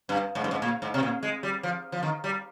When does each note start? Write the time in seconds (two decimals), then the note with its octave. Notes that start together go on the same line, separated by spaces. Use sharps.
0.09 G2
0.35 G#2
0.44 G2
0.51 G#2
0.62 A#2
0.82 G#2
0.94 C3
1.03 A#2
1.23 G#3
1.43 G3
1.63 F3
1.92 F3
2.03 D#3
2.24 G3